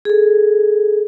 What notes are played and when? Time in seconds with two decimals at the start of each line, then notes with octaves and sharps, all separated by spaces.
0.05 G#4 A4